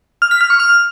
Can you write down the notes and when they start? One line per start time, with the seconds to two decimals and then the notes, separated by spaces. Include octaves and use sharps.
0.22 F6
0.31 B6
0.41 F6
0.50 C#6
0.60 F6